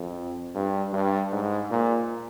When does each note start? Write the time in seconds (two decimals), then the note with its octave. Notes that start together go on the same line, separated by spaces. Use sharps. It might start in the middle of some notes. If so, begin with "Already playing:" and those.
Already playing: F2
0.55 G2
0.93 G2
1.32 G#2
1.71 A#2